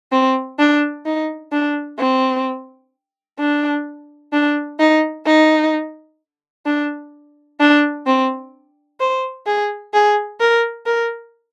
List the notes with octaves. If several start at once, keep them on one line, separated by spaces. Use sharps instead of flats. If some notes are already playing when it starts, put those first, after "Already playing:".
C4
D4
D#4
D4
C4
D4
D4
D#4
D#4
D4
D4
C4
C5
G#4
G#4
A#4
A#4